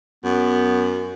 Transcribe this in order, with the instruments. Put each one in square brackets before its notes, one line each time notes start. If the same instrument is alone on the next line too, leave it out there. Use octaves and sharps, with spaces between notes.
[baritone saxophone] F#2 [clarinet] B3